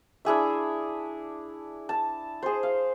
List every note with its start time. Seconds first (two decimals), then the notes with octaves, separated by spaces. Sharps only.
0.25 D4 E4 G#4 E5
1.89 A5
2.42 G#4 C5
2.63 F5